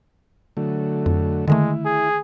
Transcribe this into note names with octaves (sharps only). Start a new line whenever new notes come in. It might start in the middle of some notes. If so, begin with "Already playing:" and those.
D3 F#3 A3
F2
D3 D#3 G#3 A3 E4
G#4